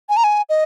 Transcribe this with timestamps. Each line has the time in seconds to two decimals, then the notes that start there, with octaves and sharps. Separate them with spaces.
0.09 G#5
0.17 A#5
0.24 G#5
0.49 D#5